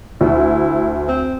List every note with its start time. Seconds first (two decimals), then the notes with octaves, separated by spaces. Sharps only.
0.21 D2 E4
1.08 C4